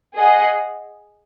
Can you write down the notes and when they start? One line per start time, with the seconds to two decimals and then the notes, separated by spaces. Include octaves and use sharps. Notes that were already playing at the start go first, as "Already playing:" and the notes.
0.16 G#4 D#5 F#5